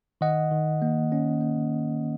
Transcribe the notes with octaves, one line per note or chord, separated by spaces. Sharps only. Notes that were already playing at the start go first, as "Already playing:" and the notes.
D#3 D#5 F#5
D#3
A#3
C#4
A#3